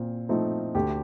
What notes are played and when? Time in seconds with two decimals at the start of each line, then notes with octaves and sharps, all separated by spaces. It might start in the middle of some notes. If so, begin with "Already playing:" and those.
Already playing: A#2 C4
0.29 F3 A3 C4 D#4
0.75 D2 G4